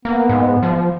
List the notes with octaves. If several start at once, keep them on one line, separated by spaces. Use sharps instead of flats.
A#3 B3
G#2
F3